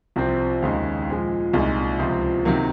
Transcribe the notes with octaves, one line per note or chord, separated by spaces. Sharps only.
C2 C3 F3 C4
D#2 C#3 G#3 D#4
A#2 F3 G#3
C2 A#2 G#3 D#4
C#2 C3 F3 C4
C3 D#3 F#3 A#3